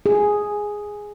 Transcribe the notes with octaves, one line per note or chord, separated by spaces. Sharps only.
G#4